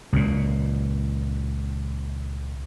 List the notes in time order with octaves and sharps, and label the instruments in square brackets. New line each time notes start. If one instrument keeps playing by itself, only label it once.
[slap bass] C#2 A#2